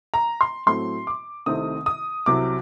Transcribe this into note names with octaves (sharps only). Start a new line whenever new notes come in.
A#5
C6
A2 F#3 A3 C4 C6
D6
C2 C3 D#3 A3 C4 D#6
D#6
C2 C3 F#3 D6